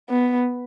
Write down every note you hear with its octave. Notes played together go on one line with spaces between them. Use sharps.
B3